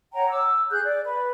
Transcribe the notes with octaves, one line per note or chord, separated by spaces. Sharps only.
C#5 F#5 G5 A#5
D6 E6
G#4 F#6 G6
D5
B4